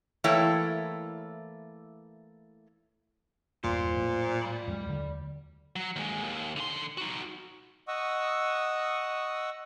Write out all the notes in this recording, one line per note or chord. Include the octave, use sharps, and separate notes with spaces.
E3 A3 A#3 E4 C#5 G5
G1 E2 A#2 G3 C5
A2 F#3 A#3
D5 B5
F2 F#3 G#3
D#2 D3
F#3
D#2 G#3
D#2
D3 C6
D#4 F#4
D#5 F#5 C#6 D#6 E6